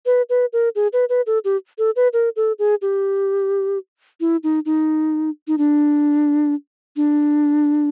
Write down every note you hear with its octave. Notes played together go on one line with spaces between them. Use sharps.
B4
B4
A#4
G#4
B4
B4
A4
G4
A4
B4
A#4
A4
G#4
G4
E4
D#4
D#4
D#4
D4
D4